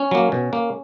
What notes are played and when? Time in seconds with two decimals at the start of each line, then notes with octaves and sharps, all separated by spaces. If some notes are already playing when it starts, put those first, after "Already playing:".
Already playing: C#4
0.11 F#3 A#3
0.32 B2
0.53 A#3